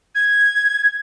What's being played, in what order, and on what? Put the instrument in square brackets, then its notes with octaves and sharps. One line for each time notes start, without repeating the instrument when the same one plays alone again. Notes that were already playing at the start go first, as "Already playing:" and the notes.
[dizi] G#6